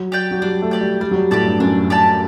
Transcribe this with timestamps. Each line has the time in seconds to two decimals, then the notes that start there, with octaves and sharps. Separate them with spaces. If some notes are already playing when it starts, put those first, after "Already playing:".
Already playing: F#3
0.12 G4 D5 G5
0.31 F#3
0.42 G3 D4
0.62 A3
0.71 G4 D5 G5
0.81 G3
1.01 G3 D4
1.11 F#3
1.16 G3
1.31 A2 G4 D5 A5
1.46 G2
1.60 F#2 D4
1.90 G4 D5 A5